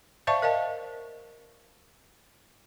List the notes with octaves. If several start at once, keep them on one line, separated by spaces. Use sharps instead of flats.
C5 D5 E5 F5 A5 C#6
A#4 D#5 F5 A5